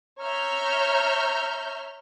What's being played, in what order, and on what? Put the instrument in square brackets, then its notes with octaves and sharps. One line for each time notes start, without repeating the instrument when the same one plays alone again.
[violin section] C#5 E5 A#5 F6 G6